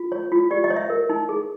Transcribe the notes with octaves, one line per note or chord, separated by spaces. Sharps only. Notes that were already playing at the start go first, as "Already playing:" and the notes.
Already playing: F4
C#5
F4
G4 D5
D#5
C#5
E5
A#4
D#4
G#4